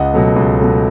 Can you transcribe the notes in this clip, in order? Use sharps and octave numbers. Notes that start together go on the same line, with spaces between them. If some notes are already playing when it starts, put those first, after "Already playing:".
Already playing: C#2 D#5 F#5
B2 F#3 A3
C#2
B2 F#3 A3